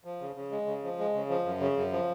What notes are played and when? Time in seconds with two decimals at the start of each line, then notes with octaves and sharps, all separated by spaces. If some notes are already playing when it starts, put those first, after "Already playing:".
0.05 F3
0.21 C#3
0.36 C#3
0.52 G#3
0.67 C#3
0.84 F3
0.99 G#3
1.14 C#3
1.29 F3
1.45 F#2
1.61 C#3
1.77 F#2
1.92 F3